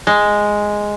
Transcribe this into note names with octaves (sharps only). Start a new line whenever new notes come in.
G#3